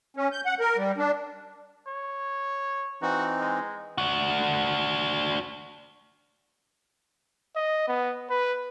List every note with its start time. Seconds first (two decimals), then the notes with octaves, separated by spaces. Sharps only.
0.17 C#4
0.32 G6
0.46 F#5
0.60 A#4
0.77 G3
0.98 D4
1.87 C#5
3.02 E3 C4 D#4 F#4
3.41 G#3
3.98 D4 F#4
7.56 D#5
7.88 B3
8.30 B4